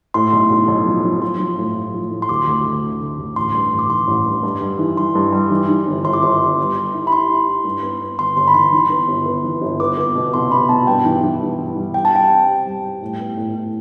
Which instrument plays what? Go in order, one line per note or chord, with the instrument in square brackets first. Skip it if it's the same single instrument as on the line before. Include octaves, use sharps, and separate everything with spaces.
[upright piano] A2 [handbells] C6
[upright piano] B1
B1
B1
F3
F3
[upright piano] F3 [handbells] C6
[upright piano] F3
A2
A2
F3
A2
[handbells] C6
[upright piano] D2 [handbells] D6
[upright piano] D2
A3
D3
D3
D2
[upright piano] A1 [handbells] C6
[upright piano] G2
A1
[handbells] D6
[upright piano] E3 [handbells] C6
[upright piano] A1
G2
G2
G3
E3
[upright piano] G3 [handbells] C6
[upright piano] G2
G3
E3
E3
G1
[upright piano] G1 [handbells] C6
[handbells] D6
[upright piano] G1 [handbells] C6
[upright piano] G2
G4
G4
E4
[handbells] B5
[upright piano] E4 [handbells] C6
[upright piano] G4
E4
G2
B3
B3
[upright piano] G1 [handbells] C6
[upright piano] G1 [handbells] C6
[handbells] B5
[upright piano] E3 [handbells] C6
[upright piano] E3
B3
G1
B3
E3
G1
[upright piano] B3 [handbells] D6
[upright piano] B3 [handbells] D6
[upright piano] B2
[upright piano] C2 [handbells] C6
[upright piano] B2 [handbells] B5
[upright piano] B2 [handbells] A5
[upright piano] G2 [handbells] G5
[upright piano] E3
E3
G2
E3
G3
[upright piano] G4 [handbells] G5
[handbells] A5
[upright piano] G4 [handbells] G5
[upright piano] C4
G4
G3
G4
A2
B3
A2
A2